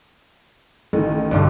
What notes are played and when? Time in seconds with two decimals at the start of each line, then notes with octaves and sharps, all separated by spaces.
0.93 A1 D#3
1.31 B1 G2 D3